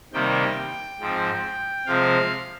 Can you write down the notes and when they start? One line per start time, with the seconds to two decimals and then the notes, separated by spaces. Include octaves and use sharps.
0.13 C3 D#3 G3 A#3 G5
1.00 G#2 F3 C4
1.86 C3 F3 G#3 C4 F5